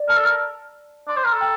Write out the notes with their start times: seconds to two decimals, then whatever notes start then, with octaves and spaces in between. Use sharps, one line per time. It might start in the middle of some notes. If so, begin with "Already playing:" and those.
Already playing: D5
0.08 A#4 A5
0.17 A4
0.25 A#4
1.08 D5 C6
1.16 C5
1.25 A#4 A#5
1.33 A4
1.41 G5